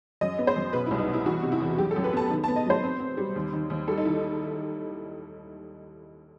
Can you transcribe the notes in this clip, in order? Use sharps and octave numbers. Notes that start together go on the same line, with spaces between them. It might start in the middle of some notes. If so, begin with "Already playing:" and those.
F#2 D#5
B3
C5
F#2
B2 B4
E4
C2
D#4
B2
E4
E3 F#4
C3
E4
E2
F#3 G4
A4
F#2
B4
B3 A5
D#3
A5
B3
D#5
F#3 C5
C4
C4
G3
D#2
D#3
D#2
G3 A4
D#4
D#3 E4